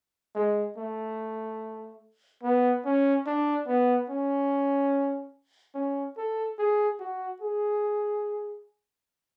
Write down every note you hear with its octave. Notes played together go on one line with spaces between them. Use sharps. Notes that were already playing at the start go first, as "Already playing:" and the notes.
G#3
A3
B3
C#4
D4
B3
C#4
C#4
A4
G#4
F#4
G#4